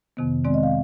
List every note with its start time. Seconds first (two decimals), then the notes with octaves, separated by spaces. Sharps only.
0.17 F2 C3 D#3 B3
0.44 C3 D#3 G#3 C4 D5
0.54 D#5
0.63 F5